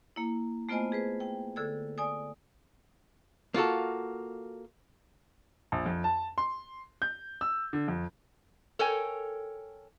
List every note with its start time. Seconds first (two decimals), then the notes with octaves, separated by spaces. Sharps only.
0.16 A#3 E4
0.69 A3 B3 F4 C5 D#5 G#5
0.92 G#4 B4 C5
1.20 G5
1.56 D3 A4 E6 G#6
1.98 D5 G#5 D#6
3.54 A#3 F4 F#4 A4
5.72 A#1
5.86 F2
6.04 A5
6.38 C6
7.02 G6
7.41 E6
7.73 D3
7.88 F2
8.79 A4 A#4 C#5 G5 G#5